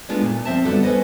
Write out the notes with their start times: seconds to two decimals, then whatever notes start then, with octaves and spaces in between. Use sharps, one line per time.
0.09 G#3 A3 B3 D4 D#4 F4
0.22 A#2
0.45 F3 C4 E5 A5
0.65 D3 G3 B3 D#4 F#4 A4
0.83 C#4 B4 C5 D#5